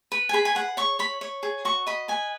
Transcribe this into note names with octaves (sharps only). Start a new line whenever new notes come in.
B4
G#5
G#4 B5
G#5
G#4 F#5
C#5 C#6
C#5 B5
C#5
G#4
F#4 C#6
D#5 B5
B4 G#5